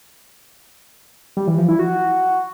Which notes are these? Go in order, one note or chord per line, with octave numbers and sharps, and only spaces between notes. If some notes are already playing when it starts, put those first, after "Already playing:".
G3
E3
F3
E4
F#4